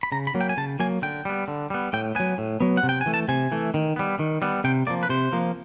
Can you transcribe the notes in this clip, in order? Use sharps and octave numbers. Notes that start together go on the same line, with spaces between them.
B5
C#3 A#5
B5
F#3 A#3
G5
G#5
C#3 A5
F#3 A#3 G#5
D3 G5
G3 B3
D3
G3 B3
A2 G5
F#3 B3 G#5
A2
F#3 B3
F#5
C3
G5
G#5
E3 A3
A5
C3 G#5
E3 A3
D#3
G3 B3
D#3
G3 B3
C3 G5
F3 A#3 D5
B4
C3 C5
F3 A#3